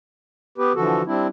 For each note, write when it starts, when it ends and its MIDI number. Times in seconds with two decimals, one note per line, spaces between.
0.58 0.72 59
0.58 0.72 67
0.58 0.72 71
0.75 1.02 50
0.75 1.02 52
0.75 1.02 53
0.75 1.02 66
0.75 1.02 69
1.06 1.27 55
1.06 1.27 60
1.06 1.27 62
1.06 1.27 64